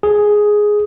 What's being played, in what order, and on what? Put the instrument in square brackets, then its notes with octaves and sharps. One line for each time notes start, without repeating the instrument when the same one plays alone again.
[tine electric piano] G#4